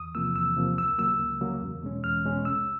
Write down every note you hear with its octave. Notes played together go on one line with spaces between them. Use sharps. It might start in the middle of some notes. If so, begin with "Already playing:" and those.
Already playing: E2 D#6
C3 F3 A#3 E6
E2 E6
C3 F3 A#3
C#2 E6
C#3 F#3 A#3 E6
C#2
C#3 F#3 A#3
E2
B2 G#3 C#4
E2 F6
B2 G#3 C#4
C2 E6